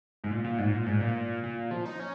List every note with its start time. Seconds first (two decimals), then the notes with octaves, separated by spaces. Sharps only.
0.24 G#2
0.31 A#2
0.44 A#2
0.58 G#2
0.73 A#2
0.86 G#2
1.00 A#2
1.43 A#2
1.71 F3
1.86 D#4
2.00 C#4